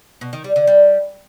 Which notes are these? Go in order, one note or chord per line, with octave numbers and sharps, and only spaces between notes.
B2
D#3
G3
D3
G3